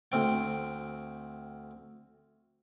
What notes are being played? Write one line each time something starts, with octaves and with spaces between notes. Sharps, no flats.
D2 C4 G5